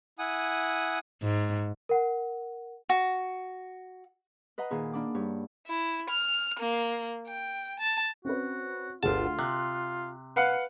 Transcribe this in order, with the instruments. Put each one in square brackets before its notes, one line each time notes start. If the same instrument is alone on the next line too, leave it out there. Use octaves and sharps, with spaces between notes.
[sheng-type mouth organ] E4 F#5 G#5 D#6
[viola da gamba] G#2
[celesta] A#4 F#5
[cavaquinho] F#4
[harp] B4 D#5 F#5 A#5 C6
A#2 D#3 G#4 B5
A#3 D4 B5 D6
G2 C#5
[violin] E4
F6
A#3
G5
A5
[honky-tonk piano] C4 C#4 B4 [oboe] F#4
[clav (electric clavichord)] G1 A5 [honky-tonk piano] D2 G#4 F#5 [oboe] F4
[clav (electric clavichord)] C3 [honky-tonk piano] F#6
[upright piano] B4 F5 F#5